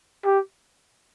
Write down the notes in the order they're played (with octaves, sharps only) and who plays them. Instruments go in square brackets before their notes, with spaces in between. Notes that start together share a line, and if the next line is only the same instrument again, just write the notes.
[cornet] G4